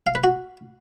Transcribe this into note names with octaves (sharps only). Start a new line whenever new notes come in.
F5
B4
F#4